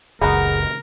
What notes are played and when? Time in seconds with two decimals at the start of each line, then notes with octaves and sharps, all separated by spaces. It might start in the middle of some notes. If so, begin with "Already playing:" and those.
0.21 F#1 C#2 B3 D#4 F#4 G#4 A#4